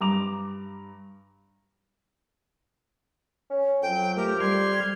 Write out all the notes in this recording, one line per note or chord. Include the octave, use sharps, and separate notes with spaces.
G2 A#5 D6 F7
C#4
F2 F#3 G5
A3 G4 A#4
G3 C6 F6 G#6